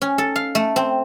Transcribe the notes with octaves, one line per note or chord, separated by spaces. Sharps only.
C#4
A4
F5
A3
C4